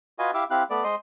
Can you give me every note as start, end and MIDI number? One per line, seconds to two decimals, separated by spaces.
0.19 0.31 65
0.19 0.31 66
0.19 0.31 71
0.19 0.31 75
0.19 0.31 77
0.19 0.31 80
0.34 0.44 64
0.34 0.44 67
0.34 0.44 76
0.34 0.44 77
0.34 0.44 86
0.50 0.63 60
0.50 0.63 64
0.50 0.63 67
0.50 0.63 77
0.50 0.63 90
0.70 0.84 57
0.70 0.84 59
0.70 0.84 74
0.84 0.95 56
0.84 0.95 72
0.84 0.95 75
0.84 0.95 84